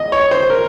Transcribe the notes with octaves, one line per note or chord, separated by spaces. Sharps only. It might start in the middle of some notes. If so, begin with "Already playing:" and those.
Already playing: D#5
C#5
C5
A#4